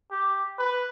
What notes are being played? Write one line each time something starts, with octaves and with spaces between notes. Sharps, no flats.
G4
B4